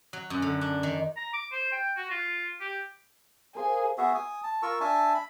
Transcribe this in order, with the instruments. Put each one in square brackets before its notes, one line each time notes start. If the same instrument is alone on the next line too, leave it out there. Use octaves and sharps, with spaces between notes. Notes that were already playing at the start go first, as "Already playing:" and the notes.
[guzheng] F#3
F#2
D3
D4
D#3
[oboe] A#5
D6
C5
G5
F#4
F4
G4
[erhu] G#4 [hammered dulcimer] A#4 C5 F5
[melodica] B3 F#4 G#4 E5
G#5 D#6
A5
F4 A#4 C#6 E6
D4 E5 G#5 A5
B5